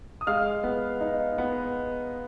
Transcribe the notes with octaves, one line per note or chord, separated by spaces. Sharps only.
D#6
G#3 F5 F6
B3
D#4
B3